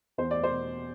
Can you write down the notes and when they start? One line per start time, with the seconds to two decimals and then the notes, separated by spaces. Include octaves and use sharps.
0.18 E2 C5
0.31 D5
0.44 C5
0.51 B2